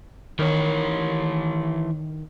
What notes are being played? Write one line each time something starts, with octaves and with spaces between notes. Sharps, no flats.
D#3 E3 C#5